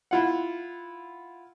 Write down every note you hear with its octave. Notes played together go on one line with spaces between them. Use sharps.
E4 F4 F#5